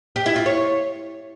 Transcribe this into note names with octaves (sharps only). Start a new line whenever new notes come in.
G4
E4
F4
C#5